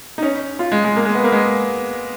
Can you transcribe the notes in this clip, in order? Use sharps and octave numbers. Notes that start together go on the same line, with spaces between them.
D#4
C#4
F4
G#3
G#3
A#3
G#3
B3
A#3
G#3